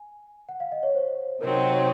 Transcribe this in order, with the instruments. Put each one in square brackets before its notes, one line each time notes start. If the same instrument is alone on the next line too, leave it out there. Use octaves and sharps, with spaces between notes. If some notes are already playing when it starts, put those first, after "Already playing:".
Already playing: [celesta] G#5
F#5
F5
D#5
C#5
C5
[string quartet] C3 F#3 C4 D#4 [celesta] A#4
[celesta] C#5